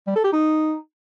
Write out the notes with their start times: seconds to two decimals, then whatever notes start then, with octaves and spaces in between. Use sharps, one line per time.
0.07 G3
0.15 A4
0.24 G4
0.33 D#4